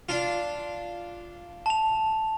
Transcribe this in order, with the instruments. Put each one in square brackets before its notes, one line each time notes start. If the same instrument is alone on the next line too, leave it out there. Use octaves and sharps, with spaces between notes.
[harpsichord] D4 F4
[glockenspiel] A5 F7